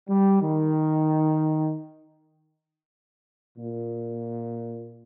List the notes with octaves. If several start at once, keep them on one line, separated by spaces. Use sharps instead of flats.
G3
D#3
A#2